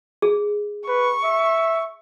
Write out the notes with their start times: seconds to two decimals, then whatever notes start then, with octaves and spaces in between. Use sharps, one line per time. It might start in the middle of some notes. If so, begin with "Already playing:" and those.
0.22 G#4
0.88 B4 C#6
1.24 E5